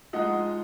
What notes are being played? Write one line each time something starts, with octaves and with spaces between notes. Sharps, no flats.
F3 G#3 D#4 D#5 F#5